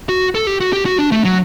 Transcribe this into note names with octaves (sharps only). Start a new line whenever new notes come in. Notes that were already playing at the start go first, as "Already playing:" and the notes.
F#4
A4
G4
F#4
G4
F#4
D4
A3
F#3